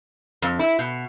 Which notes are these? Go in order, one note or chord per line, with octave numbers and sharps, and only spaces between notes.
F2
E4
B2